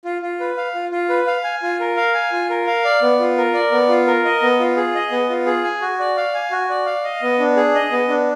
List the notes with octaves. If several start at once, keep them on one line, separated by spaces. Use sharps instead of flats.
F4
F4
B4
F5
F4
F4
B4
F5
G#5
F4
A#4
F5
G#5
F4
A#4
F5
D5
B3
F4
A#4
D5
B3
F4
A#4
D#5
B3
F4
G#4
D#5
B3
F4
G#4
G#5
F#4
D5
F5
G#5
F#4
D5
F5
D#5
B3
D4
G#4
D#5
B3
D4